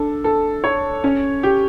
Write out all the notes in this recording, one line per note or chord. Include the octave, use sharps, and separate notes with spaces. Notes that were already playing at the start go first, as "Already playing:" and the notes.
Already playing: D4 A4
A4
C#5
C#4
G4